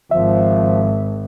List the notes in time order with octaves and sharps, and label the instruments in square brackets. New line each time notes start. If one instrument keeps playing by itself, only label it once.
[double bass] G#1 [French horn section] F3 [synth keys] E5